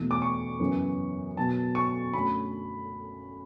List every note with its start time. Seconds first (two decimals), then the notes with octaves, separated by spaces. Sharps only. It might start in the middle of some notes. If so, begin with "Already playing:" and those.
Already playing: E2 B2 A3
0.11 D6
0.22 C#6
0.60 F#2 C#3 E3 B3
1.37 B2 F#3 B3 A5
1.75 C#6
2.13 F#2 D3 F#3 A3 B5